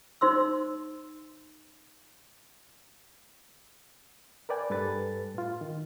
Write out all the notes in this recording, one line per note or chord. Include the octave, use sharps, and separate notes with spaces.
D#4 C5 C6 E6
A#4 B4 D5 G5 G#5
G2 G3 A4 B4 A6
A2 F4
D#3